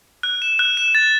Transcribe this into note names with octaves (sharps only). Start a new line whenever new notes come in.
F#6
E7
F#6
E7
A6